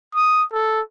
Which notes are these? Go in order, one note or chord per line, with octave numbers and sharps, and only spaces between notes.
D#6
A4